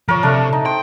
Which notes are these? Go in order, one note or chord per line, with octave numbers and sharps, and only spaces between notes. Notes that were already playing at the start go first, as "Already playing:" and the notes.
F3 A#4 C#5
C3 A3 D4
D#4
C5 G5